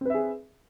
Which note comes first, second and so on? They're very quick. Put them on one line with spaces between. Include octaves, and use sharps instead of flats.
C4 B4 E5 G#4